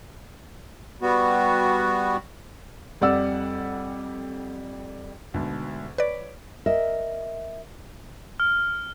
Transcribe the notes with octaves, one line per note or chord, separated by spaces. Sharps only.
G3 B3 F#4
F2 G3 D5 F#5 E6
D2 G#2 B2
B4 C#5 D5
A#4 D#5 E5
F6